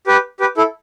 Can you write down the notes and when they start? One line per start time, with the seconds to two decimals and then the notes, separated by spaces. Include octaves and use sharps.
0.07 G4 B4
0.40 G4 B4
0.57 E4 A4